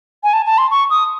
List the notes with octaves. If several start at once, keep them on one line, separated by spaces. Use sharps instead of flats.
G#5
A5
A5
C6
C#6
D#6